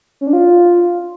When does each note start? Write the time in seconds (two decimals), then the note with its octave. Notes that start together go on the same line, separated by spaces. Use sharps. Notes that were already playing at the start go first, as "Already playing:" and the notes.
0.21 C#4
0.27 D4
0.33 F4